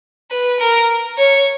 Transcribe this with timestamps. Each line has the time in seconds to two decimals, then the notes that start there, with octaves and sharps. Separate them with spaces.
0.31 B4
0.60 A#4
1.18 C#5